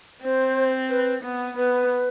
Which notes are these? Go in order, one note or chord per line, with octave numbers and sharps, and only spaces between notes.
C4 C5
B4
B3
B3 B4